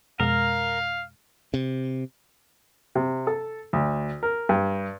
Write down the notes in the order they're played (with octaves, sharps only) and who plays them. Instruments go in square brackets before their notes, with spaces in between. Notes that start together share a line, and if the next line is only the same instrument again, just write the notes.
[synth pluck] F2 B2 G#3 [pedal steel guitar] A#4 [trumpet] F5
[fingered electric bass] C3
[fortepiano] C3
A4
D2
A#4
G2